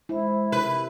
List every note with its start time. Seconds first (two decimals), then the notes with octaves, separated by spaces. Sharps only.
0.09 G#3 E4 C5 E5
0.52 C3 E4 A#4 B4